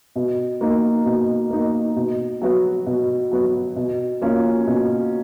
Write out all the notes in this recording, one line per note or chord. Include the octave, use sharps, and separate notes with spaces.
B2
A#3 D#4
B2
A#3 D#4
B2
F#3 B3 F#4
B2
F#3 B3 F#4
B2
A#3 C#4 F4
B2